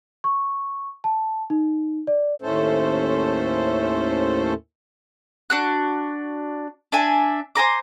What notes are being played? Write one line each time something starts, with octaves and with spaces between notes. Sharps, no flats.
C#6
A5
D#4
D5
D#2 A2 A3 C#4 A4 C5
D4 F#4 F#6
D4 E5 G#5
C5 G#5 A#5 D6